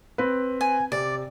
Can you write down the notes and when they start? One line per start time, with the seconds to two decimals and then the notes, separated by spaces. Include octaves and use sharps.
0.18 C4 B4
0.61 G#5
0.92 C3 D5